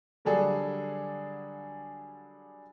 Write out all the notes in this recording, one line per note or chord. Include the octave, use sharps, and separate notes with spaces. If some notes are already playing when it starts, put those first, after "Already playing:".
D3 F#3 G3 D4 G#4 A4